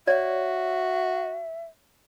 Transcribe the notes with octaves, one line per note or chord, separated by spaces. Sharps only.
F#4 C#5 D5 E5